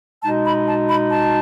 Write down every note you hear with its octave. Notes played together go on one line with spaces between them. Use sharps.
B2 G#3 D#4 A5
B5
A5
B5
A5